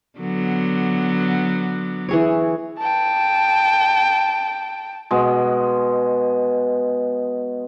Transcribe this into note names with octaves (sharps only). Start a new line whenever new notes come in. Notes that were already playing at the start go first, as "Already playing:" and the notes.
D3 F#3 B3
E3 G#4 C#5
G5 A5
B2 G#3